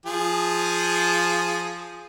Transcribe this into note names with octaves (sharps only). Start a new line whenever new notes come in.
F3 G#4